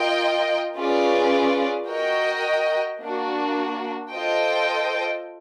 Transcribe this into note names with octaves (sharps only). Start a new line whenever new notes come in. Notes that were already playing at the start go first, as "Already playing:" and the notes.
Already playing: F4 A#4 D#5 G5
C#4 F4 G#4 B4 D5
F#4 A#4 D#5 G5
A#3 D4 F#4
F4 A4 C5 D#5 G5